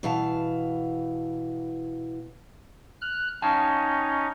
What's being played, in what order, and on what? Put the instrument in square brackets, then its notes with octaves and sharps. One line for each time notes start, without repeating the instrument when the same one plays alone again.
[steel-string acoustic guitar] B2 E3 F5 A5
[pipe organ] F6 F#6
[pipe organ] C#4 D#4 [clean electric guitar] F5 G5 A5